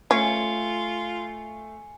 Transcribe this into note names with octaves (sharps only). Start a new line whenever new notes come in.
A3 C#4 F4 G#5 C#7